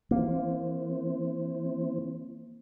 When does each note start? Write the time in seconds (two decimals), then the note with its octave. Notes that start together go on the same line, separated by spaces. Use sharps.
0.11 E3 A#3 C4